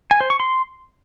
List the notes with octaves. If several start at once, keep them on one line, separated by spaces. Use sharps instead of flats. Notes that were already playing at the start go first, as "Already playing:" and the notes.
G#5
C5
C#6
C6